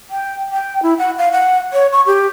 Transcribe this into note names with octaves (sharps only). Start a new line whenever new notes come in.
G5
G5
E4
F#5
F5
F#5
C#5
C#6
G4